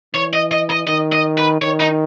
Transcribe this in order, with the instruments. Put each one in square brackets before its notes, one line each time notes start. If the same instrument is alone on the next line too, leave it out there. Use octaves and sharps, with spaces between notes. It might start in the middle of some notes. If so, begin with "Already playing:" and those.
[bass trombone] E3 [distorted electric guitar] C#5
[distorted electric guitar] D#5
D#5
D#5
[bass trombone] D#3 [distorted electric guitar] D#5
[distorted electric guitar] D#5
B4
[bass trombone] D#3 [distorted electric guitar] C#5
[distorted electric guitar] D#4